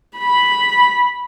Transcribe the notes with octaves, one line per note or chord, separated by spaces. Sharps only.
B5